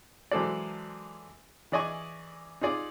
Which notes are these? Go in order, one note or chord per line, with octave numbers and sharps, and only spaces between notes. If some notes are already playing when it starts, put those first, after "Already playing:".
E3 F#3 G#3 A4 C5 D5
E3 G#4 D5 D#5 G#5 C#6
D#4 F4 G#4 D5